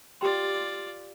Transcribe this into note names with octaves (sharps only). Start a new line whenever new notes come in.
F4 G4 D5 G5 C6